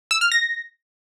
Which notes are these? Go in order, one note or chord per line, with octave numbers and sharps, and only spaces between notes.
E6
F6
A#6